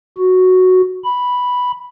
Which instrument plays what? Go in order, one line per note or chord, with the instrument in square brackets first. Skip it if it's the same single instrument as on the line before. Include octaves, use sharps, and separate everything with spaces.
[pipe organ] F#4
B5